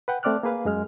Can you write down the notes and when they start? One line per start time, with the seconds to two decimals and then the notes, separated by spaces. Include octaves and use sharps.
0.08 B4 F#5 G5
0.23 A3 C4 D5 D6 F6 F#6
0.43 A#3 G#4 B4 F5
0.65 F#2 G#3 F6